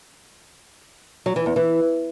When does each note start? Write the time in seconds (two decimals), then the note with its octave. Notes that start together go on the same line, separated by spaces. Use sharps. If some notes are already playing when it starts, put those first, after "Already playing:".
1.26 F#3
1.36 E3
1.46 E2
1.56 E3